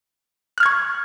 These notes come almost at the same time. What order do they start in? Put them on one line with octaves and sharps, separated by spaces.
F#6 F6 G#6 C#6